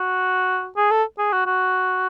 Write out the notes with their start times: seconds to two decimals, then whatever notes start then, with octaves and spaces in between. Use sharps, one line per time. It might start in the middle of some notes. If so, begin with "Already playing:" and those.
Already playing: F#4
0.76 G#4
0.91 A4
1.18 G#4
1.32 F#4
1.46 F#4